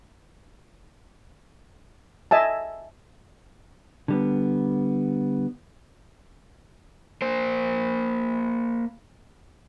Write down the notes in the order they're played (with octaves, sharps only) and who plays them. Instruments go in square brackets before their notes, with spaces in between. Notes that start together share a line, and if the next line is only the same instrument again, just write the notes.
[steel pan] D#5 E5 G#5 A5
[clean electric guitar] D3 G3 B3
[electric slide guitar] A#3 C5